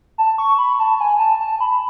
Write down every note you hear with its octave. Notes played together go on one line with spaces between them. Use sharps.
A5
C#6
B5
A5
G#5
A5
A5
B5